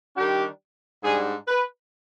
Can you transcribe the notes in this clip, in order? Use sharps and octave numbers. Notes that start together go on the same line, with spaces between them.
D#3 G3 D4 G4
G#2 G3 D4 G#4
B4